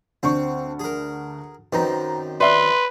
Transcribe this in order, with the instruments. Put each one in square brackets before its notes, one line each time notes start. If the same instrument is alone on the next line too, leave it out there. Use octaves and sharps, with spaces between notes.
[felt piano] D2 D4 C#6 [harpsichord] C4
[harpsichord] G#4 A#4
[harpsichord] F#2 D#3 C4 [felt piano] B4 A#5
[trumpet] B4 [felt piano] D5 E5 F#6 [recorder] C6